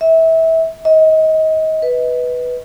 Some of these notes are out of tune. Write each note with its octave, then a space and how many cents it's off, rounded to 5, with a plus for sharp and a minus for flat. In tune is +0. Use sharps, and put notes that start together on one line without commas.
E5 -25
D#5 +25
B4 +0